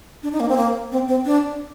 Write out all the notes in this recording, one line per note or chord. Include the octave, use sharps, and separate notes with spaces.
D4
D#4
A#3
C4
A#3
C4
C4
D4